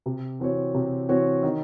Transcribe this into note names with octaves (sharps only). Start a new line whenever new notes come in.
C3
E3 C4 F#4 C#5
C3
E3 C4 F#4 C#5
D#3